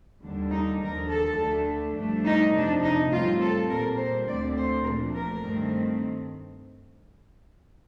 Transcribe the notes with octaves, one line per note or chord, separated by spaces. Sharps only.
D#2 D3 G3 D4
D#4
D#2 D3 F3 A#4
A4
D2 D3 A3 D4
G2 F3 A3 D4
D#4
F2 C3 F3 D4
D#4
A2 G3 C4 F4
A4
A#2 G3 C4 A#4
C5
D2 D3 A3 C4 D5
C5
A#2 F3 A3 D4 A#4
A#4
G2 D#3 A3 C4